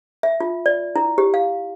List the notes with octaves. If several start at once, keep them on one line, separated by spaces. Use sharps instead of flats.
E5
F4
D5
E4
G4
F5